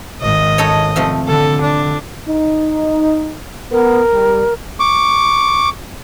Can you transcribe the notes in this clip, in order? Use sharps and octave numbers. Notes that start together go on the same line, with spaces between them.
G#1 D#5
D#4 A4 C#5
C3 F3 A3
D3 A4
D4
D#4
B3 A#4
G3
C#6 D6